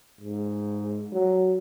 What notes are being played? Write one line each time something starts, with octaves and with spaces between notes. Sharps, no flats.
G#2
F#3